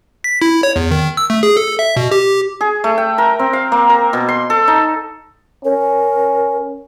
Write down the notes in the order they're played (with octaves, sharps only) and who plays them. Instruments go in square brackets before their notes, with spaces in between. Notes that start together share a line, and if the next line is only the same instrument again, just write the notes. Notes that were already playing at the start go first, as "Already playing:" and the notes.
[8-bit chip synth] B6
E4
C#5
E2
D#3
E6
A3
G#4
A4
E5
B2
G4
[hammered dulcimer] G#4
A3
G5
A#4
C4
F5
A#3
A#4
B2
C6
A4
D#4
[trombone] C#4 [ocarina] A#4